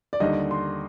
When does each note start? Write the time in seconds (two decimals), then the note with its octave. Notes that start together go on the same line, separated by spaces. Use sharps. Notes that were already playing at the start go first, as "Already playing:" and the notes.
0.13 D5
0.20 D#2 D3 G3 D#5
0.51 C6